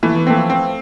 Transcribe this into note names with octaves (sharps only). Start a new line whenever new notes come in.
E3 A3
B3
F3 A3 C4
C4